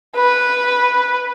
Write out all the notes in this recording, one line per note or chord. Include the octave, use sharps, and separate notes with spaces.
B4